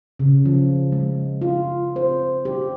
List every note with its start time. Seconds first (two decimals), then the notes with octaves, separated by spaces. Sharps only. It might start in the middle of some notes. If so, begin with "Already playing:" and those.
0.20 C#3
0.45 F3
0.92 G#3
1.41 F4
1.96 C5
2.45 G4